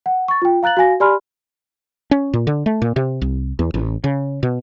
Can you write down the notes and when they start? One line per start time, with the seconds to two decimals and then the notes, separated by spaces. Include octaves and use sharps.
0.06 F#5
0.28 C#6 A6
0.42 F4 G5
0.63 F5 A#5 F#6 A6 F#7
0.77 F#4 F5 G#5 A#6
1.00 G4 D5 G#5 B5 C6 F6
2.11 C#4
2.33 A#2
2.47 D3
2.66 A3
2.82 A#2
2.96 C3
3.22 C2
3.59 E2
3.74 A1
4.04 C#3
4.43 B2